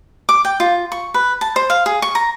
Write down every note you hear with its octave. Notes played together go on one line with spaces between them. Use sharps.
D6
G5
F4
C#6
B4
A5
C5
F5
G#4
C#6
A#5